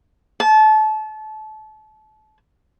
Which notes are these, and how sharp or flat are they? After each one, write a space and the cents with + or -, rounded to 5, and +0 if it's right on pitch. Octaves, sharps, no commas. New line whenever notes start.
A5 -30